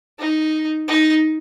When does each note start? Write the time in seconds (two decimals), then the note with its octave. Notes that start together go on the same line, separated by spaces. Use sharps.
0.19 D#4
0.88 D#4